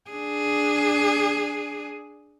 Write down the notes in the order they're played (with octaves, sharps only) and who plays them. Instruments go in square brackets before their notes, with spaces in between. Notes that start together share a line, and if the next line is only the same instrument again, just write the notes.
[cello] D4 G#4